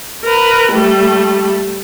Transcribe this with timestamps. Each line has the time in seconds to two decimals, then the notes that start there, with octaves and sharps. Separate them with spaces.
0.24 A#4 B4
0.72 G3 A3